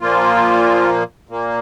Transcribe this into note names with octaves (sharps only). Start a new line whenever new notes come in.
A#2 F3 A#3 F4
A#2 A#3